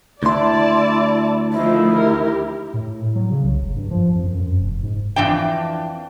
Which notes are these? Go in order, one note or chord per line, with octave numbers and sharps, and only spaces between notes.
D2 E4 D5 A5 C6
D#3 F3 A3 E4
G4 A#4
A2
F#3
C#3
C2
F#1
G2
F3
F2
F#2
F#2
F1
G#2
F2 E3 D4 G5